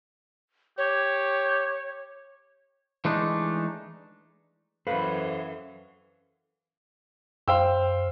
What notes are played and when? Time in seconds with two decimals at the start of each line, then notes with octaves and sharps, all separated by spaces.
0.78 G4 C#5
3.05 E3 G#3 A3 D4 D#4
4.87 F#2 E3 A4 B4 C5 F5 B5
7.48 F#2 C5 F5 G5 C6 E6